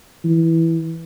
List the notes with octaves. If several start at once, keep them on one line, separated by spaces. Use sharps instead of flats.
E3